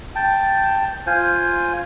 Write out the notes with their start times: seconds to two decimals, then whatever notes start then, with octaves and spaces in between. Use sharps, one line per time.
0.16 G5 A5
1.07 F4 C5 G#5